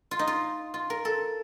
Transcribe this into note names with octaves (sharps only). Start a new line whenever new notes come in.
F4
D#4
F4
F4
A#4
A4